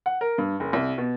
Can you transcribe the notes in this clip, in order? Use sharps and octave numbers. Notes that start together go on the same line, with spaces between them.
F#5
A#4
G2
F#1
C2
B2